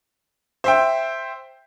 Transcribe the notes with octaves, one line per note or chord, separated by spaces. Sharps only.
C5 E5 G5